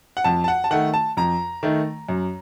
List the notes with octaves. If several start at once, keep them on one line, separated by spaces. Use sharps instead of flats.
F#5
F2 A5
A5
F#5
A5
D#3 A3 F#5
A5
F2 A#5
D#3 A3
F#2